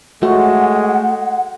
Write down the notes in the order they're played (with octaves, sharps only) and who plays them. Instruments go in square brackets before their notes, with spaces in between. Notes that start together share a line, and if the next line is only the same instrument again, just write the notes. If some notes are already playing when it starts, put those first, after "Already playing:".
[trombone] G#3 [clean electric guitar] A3 [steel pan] F#4 [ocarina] F#5